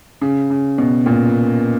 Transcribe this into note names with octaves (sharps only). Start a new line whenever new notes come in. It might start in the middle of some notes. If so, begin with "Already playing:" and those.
C#3
C#3
B2
A#2